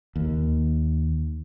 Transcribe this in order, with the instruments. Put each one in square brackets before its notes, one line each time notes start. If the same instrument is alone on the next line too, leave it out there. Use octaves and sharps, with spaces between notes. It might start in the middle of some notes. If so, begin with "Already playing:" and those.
[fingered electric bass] D#2